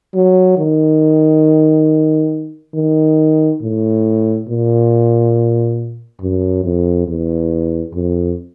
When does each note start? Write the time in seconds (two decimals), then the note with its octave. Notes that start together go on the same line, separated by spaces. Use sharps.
0.14 F#3
0.58 D#3
2.75 D#3
3.62 A2
4.48 A#2
6.20 F#2
6.64 F2
7.07 E2
7.94 F2